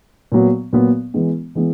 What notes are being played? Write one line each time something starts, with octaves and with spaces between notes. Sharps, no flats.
A#2 F#3 B3
A#2 F#3 B3
E3 G#3 B3
E3 G#3 B3